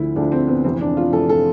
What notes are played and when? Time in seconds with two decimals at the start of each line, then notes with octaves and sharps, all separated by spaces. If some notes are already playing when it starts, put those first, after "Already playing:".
Already playing: D2 D3 F3 E4
0.16 D2 D3 F3 D4
0.32 C4
0.48 B3
0.65 F1 F2 E3 C4
0.81 D4
0.97 F4
1.13 F1 F2 E3 A4
1.29 A4